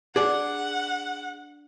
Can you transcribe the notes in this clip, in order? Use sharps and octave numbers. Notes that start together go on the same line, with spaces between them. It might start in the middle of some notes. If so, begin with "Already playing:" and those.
D4 G#4 D5 F#5